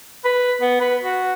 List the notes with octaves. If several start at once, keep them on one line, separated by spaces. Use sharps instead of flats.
B4
B3
B4
F#4